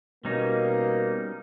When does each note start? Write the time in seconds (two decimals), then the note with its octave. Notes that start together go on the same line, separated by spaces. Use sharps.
0.25 B2 G3 A#3 C#4 D#4